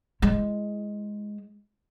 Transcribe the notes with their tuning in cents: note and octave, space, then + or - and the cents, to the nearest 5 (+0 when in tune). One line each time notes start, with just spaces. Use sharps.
G#3 +0 E4 +0